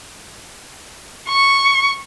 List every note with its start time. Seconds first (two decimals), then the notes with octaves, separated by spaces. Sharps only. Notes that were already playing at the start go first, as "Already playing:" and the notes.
1.28 C#6